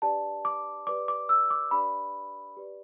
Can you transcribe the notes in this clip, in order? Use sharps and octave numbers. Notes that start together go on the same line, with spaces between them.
D4 G4 B4 D5 A5
D6
G4 B4 D5 D6
D6
E6
D6
D4 G4 B4 D5 B5
G4 B4 D5